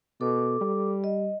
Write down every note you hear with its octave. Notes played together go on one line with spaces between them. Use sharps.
B2 A4 D6
G3
D#5